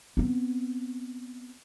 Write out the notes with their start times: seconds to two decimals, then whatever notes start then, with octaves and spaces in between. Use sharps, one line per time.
0.17 B3 C4